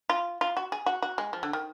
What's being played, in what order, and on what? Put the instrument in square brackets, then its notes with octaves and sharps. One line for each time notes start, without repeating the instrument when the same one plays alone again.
[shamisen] F4
F4
F#4
G#4
F#4
F#4
G#3
F3
D3
D#3